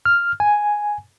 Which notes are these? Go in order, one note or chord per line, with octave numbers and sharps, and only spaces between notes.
F6
G#5